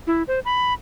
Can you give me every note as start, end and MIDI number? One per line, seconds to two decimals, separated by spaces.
0.07 0.23 64
0.28 0.40 72
0.45 0.73 83